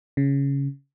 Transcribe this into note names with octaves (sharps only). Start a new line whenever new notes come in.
C#3